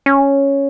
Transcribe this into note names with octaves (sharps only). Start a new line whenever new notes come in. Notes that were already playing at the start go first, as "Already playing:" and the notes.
C#4